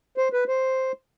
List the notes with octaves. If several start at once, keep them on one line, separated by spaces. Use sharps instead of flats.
C5
B4
C5